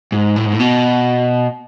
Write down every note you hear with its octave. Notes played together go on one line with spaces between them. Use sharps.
G#2
A2
G#2
A2
B2